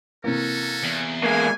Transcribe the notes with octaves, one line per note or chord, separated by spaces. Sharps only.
C3 E3 A#3 C#4 F#4 A4
E2
G#3 A#3 G#5